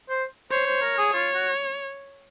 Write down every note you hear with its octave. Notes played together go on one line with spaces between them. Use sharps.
C5
C5 C#5
C5
A#4
G#4
F4 C#5
F#4